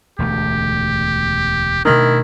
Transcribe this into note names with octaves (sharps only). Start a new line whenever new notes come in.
E1 D2 A3 G4
B2 D#3 A3 D4 E4